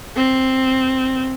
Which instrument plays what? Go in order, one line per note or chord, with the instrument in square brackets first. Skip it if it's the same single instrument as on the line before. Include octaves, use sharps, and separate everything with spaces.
[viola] C4